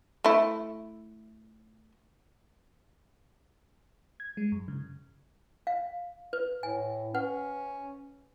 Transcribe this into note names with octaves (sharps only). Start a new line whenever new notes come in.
A3 E4
G#6
G#3
F#2
C#3
F5
B4
A2 G#5
C#4 B4 F#5